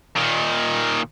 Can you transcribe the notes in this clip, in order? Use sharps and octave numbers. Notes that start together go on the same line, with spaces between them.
A#2 D#3